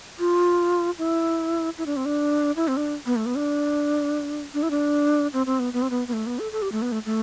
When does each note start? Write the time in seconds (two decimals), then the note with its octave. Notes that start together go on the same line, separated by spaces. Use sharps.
0.19 F4
0.98 E4
1.78 E4
1.86 D4
1.97 C4
2.05 D4
2.56 E4
2.68 C4
2.77 D4
3.06 B3
3.16 A3
3.26 B3
3.36 D4
4.54 D4
4.63 E4
4.71 D4
5.33 C4
5.46 C4
5.59 B3
5.73 B3
5.82 C4
5.90 B3
6.08 B3
6.13 A3
6.26 B3
6.39 A4
6.52 A4
6.62 G4
6.72 A3
6.82 B3
6.92 A3
7.06 A3